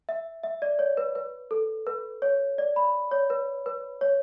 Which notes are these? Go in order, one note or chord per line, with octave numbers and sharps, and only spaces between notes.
E5
E5
D5
C#5
B4
B4
A4
B4
C#5
D5
B5
C#5
B4
B4
C#5